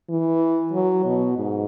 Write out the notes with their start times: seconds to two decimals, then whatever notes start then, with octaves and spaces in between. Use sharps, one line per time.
0.09 E3
0.73 F#3
1.05 B2
1.37 G#2